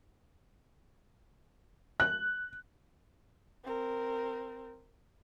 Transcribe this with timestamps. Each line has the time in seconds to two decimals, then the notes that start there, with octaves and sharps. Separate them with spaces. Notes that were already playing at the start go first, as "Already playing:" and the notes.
2.00 F#6
3.64 C4 A#4